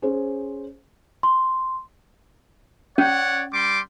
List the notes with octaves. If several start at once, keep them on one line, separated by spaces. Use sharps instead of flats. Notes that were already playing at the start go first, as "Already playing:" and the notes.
C#4 G#4 C5
C6
C#4 C#5 D5 F#5
G3 C6 D6